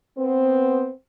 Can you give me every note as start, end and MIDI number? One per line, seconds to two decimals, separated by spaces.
0.18 0.88 59
0.18 0.88 60
0.18 0.88 72